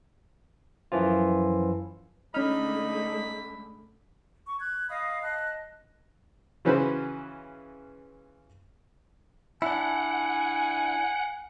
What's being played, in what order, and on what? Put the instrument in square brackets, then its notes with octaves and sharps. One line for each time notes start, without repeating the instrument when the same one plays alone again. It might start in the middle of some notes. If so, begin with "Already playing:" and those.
[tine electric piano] F#2 E3 F3 F4
[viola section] D3 G#3 A3 [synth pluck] C#4 F6 [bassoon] D#4 [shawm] B5
[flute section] C#6
F#6 G#6
D#5 F5 B5 D#6
D#5 A5 F#6
[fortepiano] C#3 E3 C#4 F#4 B4 C5
[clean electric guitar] D4 E4 [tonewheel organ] F#5 [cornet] G#5